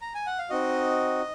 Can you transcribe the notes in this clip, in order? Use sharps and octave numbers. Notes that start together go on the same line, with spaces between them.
A#5
G#5
F#5
F5
C4 D#4 F#4 D#5